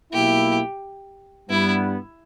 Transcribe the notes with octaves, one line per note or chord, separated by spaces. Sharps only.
B1 B2 A#3 E4 G4
G2 G3 B3 E4